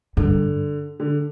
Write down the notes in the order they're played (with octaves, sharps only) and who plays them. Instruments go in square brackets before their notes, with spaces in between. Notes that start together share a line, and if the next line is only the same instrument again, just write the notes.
[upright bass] G2 [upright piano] D3
[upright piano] D3